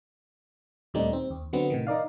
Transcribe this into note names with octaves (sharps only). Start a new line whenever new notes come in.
D#2 A#2 G3 A3 C4 D#4
C4
D#2
D3 F#3 B3 C4
A2 C3 D#3
D#4 A#4 D5 F5